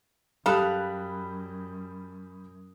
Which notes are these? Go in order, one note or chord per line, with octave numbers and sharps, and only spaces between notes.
F#2 G3 A4 F5 B5 D#6 F#6